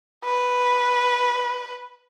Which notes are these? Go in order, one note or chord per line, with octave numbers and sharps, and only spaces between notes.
B4